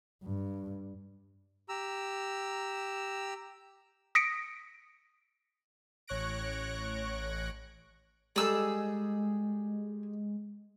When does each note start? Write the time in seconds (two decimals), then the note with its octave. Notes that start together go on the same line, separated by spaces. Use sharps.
0.24 G2
1.69 G4 A#5 E6
4.15 D#6 A#6 B6 C#7 D7
6.08 A1 C#5 C#6 F#6 A#6 D7
8.36 G3 G#3 D#4 G#4 A4 E6